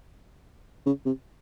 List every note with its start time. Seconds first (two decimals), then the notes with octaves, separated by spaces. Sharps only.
0.86 C#3
1.05 C3